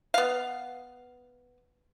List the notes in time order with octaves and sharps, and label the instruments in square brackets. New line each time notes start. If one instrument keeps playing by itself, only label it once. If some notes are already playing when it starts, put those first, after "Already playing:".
[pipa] B3 F5